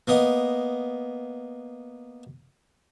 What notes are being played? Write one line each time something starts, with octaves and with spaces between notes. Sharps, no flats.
A#3 B3 D#5